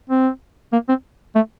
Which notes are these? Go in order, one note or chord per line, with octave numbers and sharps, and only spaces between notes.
C4
A#3
C4
A3